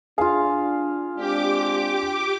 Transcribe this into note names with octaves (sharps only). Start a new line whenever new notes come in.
D4 F4 G#4 F5
G#3 C4 D4 G4 D6